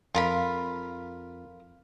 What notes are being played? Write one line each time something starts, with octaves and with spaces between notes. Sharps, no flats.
F2 F4 A#4 F5 B5